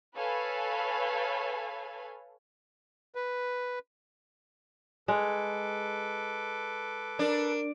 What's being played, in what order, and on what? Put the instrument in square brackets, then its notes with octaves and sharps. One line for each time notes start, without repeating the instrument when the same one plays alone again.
[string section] A4 B4 C#5 F5 G#5 B5
[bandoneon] B4
[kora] G#3 [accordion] A4 B4 D6
[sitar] D4 [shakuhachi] A#4